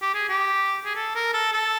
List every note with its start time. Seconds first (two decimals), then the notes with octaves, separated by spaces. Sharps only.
0.02 G4
0.14 G#4
0.29 G4
0.85 G#4
0.95 A4
1.15 A#4
1.33 A4
1.53 A4